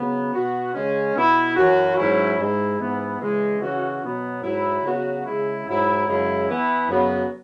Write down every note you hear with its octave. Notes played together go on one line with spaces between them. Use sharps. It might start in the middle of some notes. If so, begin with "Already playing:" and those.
Already playing: C#3 F#3 B3
B2 B3 F#4
C#3 G#3 C#4
B2 B3 E4
F#2 E3 C#4 F#4
G#2 F#3 C#4 E4
G#2 G#3 E4
G#2 E3 B3
C#3 E3 G#3
C#3 E3 C#4 F#4
B2 F#3 B3
G#2 F#3 E4
C#3 F#3 B3 F#4
C#3 G#3 E4
G#2 F#3 E4
F#2 C#3 G#3 E4
E3 B3 E4
F#2 C#3 F#3 B3